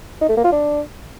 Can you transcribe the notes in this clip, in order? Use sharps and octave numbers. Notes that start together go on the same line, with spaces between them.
D#4
A3
A#3
F4
D4